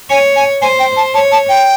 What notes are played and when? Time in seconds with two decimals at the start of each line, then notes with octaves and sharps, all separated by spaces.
0.09 C#5 G#5
0.36 G#5
0.61 C5 G#5
0.79 G5
0.96 A5
1.14 C#5 A5
1.32 A5
1.49 G5